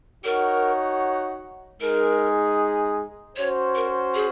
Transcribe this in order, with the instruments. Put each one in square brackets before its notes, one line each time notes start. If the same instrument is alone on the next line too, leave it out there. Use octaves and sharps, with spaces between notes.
[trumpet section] D#4 F#4 C#5 F#5 [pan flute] A#4
[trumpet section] G#3 D#4 G#4 [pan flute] A#4
[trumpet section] C#4 F#4 C5 [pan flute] C#5
[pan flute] A#4
G#4